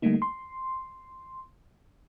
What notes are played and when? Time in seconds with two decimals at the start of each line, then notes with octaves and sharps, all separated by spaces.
0.02 D3 G3 A3 A#3 D#4
0.22 C6